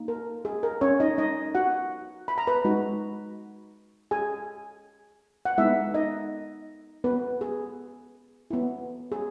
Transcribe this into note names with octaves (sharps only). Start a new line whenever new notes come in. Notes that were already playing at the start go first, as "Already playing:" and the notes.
Already playing: A#3 D#4
A#4
G#4
A#4
C#4 C#5
D#4 D#5
D#4 D#5
F#4 F#5
B5
A#5
B4 B5
G#3 D#4 F#4
G#4 G#5
F#5
G#3 B3 D#4 E4 E5
D#4 D#5
B3 B4
G#4
B3 E4
G#4